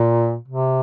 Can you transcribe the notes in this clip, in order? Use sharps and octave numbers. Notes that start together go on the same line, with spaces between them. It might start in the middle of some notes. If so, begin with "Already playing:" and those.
Already playing: A#2
C3